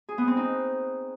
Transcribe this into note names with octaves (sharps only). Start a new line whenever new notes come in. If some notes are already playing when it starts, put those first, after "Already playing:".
G#4
B3
C4
D#4